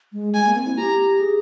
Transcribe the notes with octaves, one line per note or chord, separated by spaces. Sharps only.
G#3
G#3 G#5
A#3
C4
E4
G4 A#5
G#4